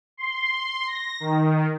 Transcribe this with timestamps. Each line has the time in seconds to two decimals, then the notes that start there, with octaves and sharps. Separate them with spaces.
0.17 C6
0.87 A#6
1.20 D#3